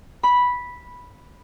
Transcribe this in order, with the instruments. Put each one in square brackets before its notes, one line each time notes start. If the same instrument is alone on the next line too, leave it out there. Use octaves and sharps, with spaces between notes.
[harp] B5